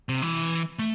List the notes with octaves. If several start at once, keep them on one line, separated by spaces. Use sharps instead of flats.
C3
E3
A3